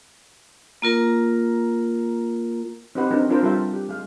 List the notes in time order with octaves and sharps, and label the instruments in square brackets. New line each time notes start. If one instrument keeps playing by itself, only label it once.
[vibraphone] A#3 F4 A#4 A#5
[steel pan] C4 D#4 G4 B4 F#5
C4 D4 D#4 F#4 A#4
C4 D4 F4 A4 A#4 C5
G3 F4 A4 A#4 E5 G5
G4
G#3 F5